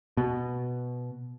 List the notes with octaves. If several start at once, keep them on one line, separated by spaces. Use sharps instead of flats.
B2